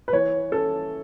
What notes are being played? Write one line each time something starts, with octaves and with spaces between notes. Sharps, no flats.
B4
E3 C#5
C#4 A4